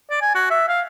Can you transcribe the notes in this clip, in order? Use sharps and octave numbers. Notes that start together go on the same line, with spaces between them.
D5
G#5
F#4
E5
F5